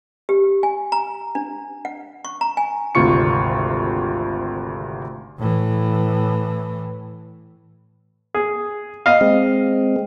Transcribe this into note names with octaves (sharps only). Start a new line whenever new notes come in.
G4
G#5
A#5
D4
F#5
C#6
A#5
G#5
G#1 D2 C3 F4 C#6 C#7
A2 E3
G#4
D#5 F5
G#3 C4